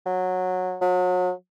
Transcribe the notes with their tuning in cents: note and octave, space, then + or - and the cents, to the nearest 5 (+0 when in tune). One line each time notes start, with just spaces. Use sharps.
F#3 -15
F#3 -35